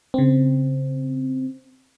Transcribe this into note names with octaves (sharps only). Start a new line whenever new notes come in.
C#3 C4